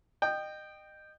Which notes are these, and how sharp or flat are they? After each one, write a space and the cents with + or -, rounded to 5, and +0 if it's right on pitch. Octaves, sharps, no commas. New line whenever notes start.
D#5 -25 G5 +0